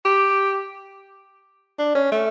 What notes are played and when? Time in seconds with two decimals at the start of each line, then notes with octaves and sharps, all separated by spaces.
0.05 G4
1.78 D4
1.95 C#4
2.11 A3